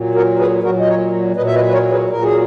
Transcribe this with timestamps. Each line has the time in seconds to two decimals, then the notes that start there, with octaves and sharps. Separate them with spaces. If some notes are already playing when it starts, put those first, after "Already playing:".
Already playing: A#2 F#3
0.15 F#4 A#4
0.39 G#4 B4
0.63 A#2 F#3 F#4 A#4
0.80 D#5
0.87 A#4 C#5
1.36 A#2 F#3 B4 D#5
1.47 E5
1.55 B4 D#5
1.67 B4
1.73 A#4 C#5
1.91 G#4 B4
2.10 A#2 F#3 A#4
2.23 G#4